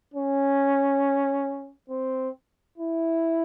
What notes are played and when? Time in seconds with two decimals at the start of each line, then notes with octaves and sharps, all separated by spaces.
0.14 C#4
1.89 C4
2.78 E4